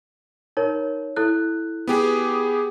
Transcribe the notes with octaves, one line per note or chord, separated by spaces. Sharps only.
D#4 A#4 C#5
E4 A4 F#6
B3 G4 G#4